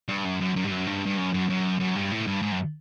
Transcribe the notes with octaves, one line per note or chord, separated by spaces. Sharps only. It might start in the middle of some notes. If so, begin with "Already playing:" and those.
G2
F#2
F#2
F#2
G2
F#2
G2
G2
F#2
F#2
F#2
F#2
G2
A2
G2
G#2
F#2